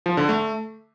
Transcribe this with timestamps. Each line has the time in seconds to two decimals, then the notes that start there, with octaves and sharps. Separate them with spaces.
0.06 F3
0.17 D3
0.29 A3